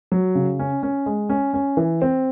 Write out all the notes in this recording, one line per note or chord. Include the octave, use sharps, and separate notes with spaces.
F#3
C#3
C#4
C#4
G#3
C#4
C#4
E3
C4